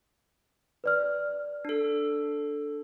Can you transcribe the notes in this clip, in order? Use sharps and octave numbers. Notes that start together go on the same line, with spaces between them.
B4 D5 F6
D4 A4